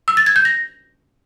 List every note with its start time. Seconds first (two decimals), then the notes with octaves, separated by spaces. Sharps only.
0.08 E6
0.17 A6
0.26 G#6
0.36 G6
0.45 A#6